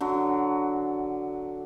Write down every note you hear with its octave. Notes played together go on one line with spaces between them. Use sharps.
D3 F#3